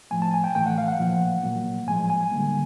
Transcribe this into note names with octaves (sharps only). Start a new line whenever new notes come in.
A2 F3 A3 G#5
A5
G#5
G5
A2 E3 A3 G5
F#5
F5
F#5
A#2 F3 A#3
A#2 F#3 A#3
A2 F3 G#3 G#5
G#5
D3 G3 A#3